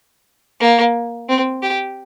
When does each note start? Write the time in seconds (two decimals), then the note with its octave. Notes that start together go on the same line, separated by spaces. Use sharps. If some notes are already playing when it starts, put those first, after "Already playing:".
0.60 A#3
1.29 C4
1.63 G4